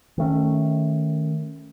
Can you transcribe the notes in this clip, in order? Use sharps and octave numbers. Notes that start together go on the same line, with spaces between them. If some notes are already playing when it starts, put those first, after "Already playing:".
D#3 A3 C#4